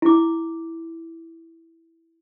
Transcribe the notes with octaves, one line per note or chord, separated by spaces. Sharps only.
E4 D6